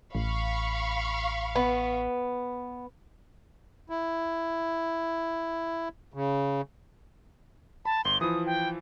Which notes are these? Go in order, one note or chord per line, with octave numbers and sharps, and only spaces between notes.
A1 F5 B5 C#6
B3
E4
C#3
A5 B5
G1 C6 G7
E3 F3 E4 D#6
G5